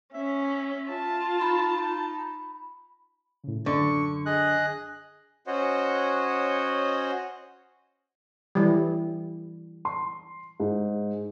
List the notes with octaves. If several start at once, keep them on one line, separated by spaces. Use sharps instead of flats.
C#4 E5
F4 A5
D#4 B5
A2 C#3
F#2 D3 C#6
G#4 D#5 F#6
C#4 F#4 C5 C#5 D#5 F#5
E3 G3
C6
G#2